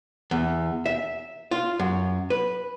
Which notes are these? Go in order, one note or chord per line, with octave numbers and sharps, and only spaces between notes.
E2
E5
F4
F#2
B4